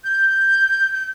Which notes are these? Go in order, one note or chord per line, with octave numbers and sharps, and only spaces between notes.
G6
G6